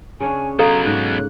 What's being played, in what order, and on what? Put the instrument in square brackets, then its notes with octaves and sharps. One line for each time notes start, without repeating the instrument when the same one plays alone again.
[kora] C#3 C#4 D4 [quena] G#5
[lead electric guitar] B2 F#3 [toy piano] A4 F5 [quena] A#5
[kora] G#2 [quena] F#6